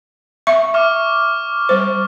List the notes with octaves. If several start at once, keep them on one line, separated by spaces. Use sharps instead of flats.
E5 C#6
E5 C#6 D6 F6
G3 C5